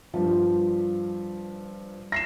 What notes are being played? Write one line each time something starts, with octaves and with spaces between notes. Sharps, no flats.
G2 F3
A#6 C7 E7